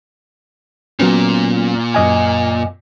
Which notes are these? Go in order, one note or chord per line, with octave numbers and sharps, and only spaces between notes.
A#2 F#3 B3 C#4
F#2 D#5 G#5